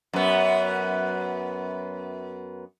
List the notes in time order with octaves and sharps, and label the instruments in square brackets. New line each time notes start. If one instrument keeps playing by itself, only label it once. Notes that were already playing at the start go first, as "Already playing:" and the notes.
[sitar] F#2 B3